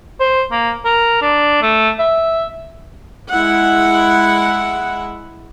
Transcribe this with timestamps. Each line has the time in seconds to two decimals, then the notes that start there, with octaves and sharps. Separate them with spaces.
0.20 C5
0.51 A#3
0.84 A#4
1.21 D4
1.62 A3
1.99 E5
3.30 G#3 E4 F#5